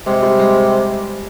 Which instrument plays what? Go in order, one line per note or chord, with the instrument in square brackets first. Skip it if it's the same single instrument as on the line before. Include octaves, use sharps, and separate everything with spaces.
[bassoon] C3 [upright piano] G#3
[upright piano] G3
G#3